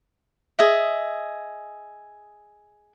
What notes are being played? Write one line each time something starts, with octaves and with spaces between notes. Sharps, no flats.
G#4 D#5 E5